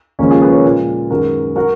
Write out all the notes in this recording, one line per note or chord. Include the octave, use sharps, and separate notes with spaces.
D#2 C#3 F3 G#3 A#3 C#4
F4 G#4
G#4 B4
A#4 C#5
A#2 G#3
F#2 D#3 G#3 F#4 A#4
F#3 F#4 A#4